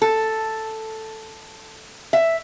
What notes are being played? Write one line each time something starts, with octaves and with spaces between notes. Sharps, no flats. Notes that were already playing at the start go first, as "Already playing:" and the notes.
A4
E5